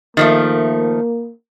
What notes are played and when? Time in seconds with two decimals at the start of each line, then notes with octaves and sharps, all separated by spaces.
0.17 D#3 F3 A3 A#3